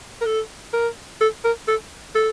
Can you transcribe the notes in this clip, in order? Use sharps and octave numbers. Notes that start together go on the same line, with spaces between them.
A#4
A4
A#4
A4
A#4
A4
A4